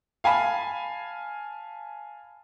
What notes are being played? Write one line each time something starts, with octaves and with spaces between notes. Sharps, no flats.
F5 G#5 A5 B5